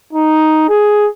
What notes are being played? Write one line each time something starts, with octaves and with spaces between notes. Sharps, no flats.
D#4
G#4